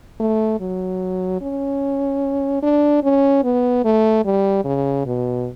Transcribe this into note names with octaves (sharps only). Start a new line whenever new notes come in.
A3
F#3
C#4
D4
C#4
B3
A3
G3
C#3
B2